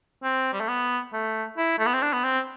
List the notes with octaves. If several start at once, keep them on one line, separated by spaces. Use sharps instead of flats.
C4
G3
A3
B3
A3
E4
A3
B3
C4
D4
B3
C4